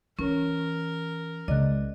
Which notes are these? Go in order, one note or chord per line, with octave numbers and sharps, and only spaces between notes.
E3 C#4 A#4 C#5
C#2 C#3 D5 D#5 F#6